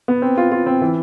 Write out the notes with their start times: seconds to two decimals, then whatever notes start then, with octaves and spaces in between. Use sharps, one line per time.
0.08 B3
0.22 C4
0.37 F4
0.51 F4
0.66 C4
0.81 E3